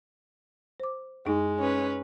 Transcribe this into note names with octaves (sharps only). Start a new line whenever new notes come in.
C5 D6
F#2 G#3 D#4
C#4 B4